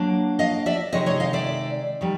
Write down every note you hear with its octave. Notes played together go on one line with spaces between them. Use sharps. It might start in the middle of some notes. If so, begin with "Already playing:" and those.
Already playing: F#3 A#3 D4
D#5 F5
D5 E5
C3 D#3 G#3 C#5 D#5
C#5 D#5
D#5 F5
D5 E5
D#3 G3